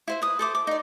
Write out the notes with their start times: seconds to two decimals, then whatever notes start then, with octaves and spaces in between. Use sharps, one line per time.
0.08 E4 C5 E5
0.22 B4 D#6
0.39 A4 C5 D6
0.55 D6
0.67 D#4 D5